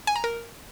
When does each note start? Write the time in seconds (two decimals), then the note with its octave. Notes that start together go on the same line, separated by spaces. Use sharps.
0.07 G#5
0.16 A#5
0.24 A#4